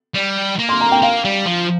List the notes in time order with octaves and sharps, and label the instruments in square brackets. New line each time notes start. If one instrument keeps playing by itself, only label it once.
[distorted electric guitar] G3
A#3
[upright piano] C6
A#5
G5
[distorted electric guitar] A#3 [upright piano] F5
[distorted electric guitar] G3
F3